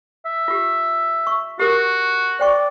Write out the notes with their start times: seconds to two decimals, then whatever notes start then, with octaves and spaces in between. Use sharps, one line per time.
0.26 E5
0.48 F4 G4
1.27 C#6
1.59 F#4 G4 A#4 D#6
2.39 C5 D5 G5 C#6